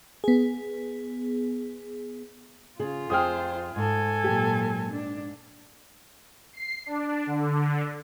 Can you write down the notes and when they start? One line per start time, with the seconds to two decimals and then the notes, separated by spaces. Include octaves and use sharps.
0.24 B3 G#4
2.79 C#3 F4 G#4
3.10 F2 G#4 C5 G5 D#6 F6
3.76 G#2 A4 G#5
4.24 A#2 F#3 G4
4.91 D4
6.53 C7
6.86 D4
7.26 D3